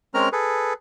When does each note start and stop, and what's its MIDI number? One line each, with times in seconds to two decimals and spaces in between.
0.14 0.29 56
0.14 0.29 60
0.14 0.29 61
0.14 0.29 70
0.14 0.29 82
0.14 0.29 89
0.32 0.73 68
0.32 0.73 69
0.32 0.73 71